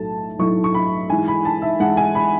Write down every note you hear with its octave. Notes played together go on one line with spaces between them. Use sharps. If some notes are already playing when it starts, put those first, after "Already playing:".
Already playing: B1 A2 F#3 A3 E4 A5
B1 A2 F#3 A3 E4 C#6
C#6
B5
G#2 E3 G#3 G#5
B5
A5
E5
G#2 E3 G#3 F#5
G#5
B5